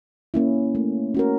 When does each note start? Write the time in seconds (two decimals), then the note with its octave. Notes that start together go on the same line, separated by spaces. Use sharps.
0.34 A#3 C#4 E4
0.75 A3
1.15 C#4 F#4 A#4